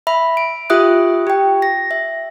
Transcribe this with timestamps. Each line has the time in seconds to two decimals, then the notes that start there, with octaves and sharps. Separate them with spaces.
0.07 E5 B5
0.37 D7
0.70 F4 G4 E5 D#6 F#6
1.27 G4 G5
1.62 A#6
1.91 E5